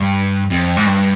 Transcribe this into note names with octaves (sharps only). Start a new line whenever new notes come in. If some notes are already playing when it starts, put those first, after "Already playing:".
Already playing: G2
F2
G#2
G2